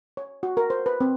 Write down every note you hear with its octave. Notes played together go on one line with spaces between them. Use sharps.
C#5
F#4
A#4
C5
B4
C4